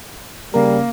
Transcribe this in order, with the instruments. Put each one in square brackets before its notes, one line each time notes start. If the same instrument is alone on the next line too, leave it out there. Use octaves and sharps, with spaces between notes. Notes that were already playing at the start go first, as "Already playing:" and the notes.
[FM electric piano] C#3 A#4 [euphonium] G3 [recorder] A#3